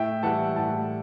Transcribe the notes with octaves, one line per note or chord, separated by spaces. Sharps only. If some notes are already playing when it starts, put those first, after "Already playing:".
Already playing: A2 E5 G5
E3 G3 F#5 A5
A2 F#5 A5